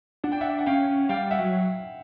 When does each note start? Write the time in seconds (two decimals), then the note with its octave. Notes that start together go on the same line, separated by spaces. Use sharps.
0.24 D4 F#5
0.32 G5
0.41 E5 F#5
0.59 F#5
0.66 C#4 F5 G5
1.09 G3 F5 G5
1.31 E5 F#5
1.39 F#3